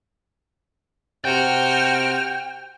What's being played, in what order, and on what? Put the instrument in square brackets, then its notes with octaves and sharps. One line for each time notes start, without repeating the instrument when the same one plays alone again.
[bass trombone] C3 [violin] F#4 F6 [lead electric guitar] G5